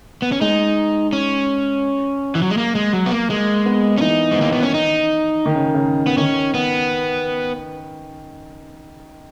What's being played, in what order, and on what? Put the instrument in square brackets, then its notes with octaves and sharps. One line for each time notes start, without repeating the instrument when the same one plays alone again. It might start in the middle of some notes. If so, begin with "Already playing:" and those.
[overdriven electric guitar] B3
C#4
[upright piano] G#3 [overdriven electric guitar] D#4
[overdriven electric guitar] C#4
E3
F#3
G#3
A#3
G#3
F#3
B3
A#3
[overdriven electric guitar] G#3 [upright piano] A#3
[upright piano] B3
[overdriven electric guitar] C#4
[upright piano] E3 [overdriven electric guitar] D#4
[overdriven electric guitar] G#3
[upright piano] D#3 [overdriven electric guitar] A#3
[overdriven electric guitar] B3
C#4
D#4
[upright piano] D#3
C#3
C#3
[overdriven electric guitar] B3
[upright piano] D#3 [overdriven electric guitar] C#4
[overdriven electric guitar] B3